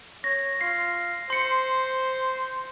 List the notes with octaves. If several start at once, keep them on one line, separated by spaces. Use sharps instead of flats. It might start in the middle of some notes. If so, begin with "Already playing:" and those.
C#5 A#6
F4 C7
C5 C6 C#7